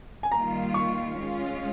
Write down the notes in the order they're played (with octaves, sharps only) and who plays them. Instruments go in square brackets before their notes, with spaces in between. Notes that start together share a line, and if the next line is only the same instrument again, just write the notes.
[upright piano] G#5
[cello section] D#3 G3 A#3 F4 [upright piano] A#5
[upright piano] C#6
[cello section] G#3 C#4 F4